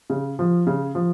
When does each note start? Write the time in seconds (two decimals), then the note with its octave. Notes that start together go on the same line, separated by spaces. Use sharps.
0.10 C#3
0.39 F3
0.67 C#3
0.95 F3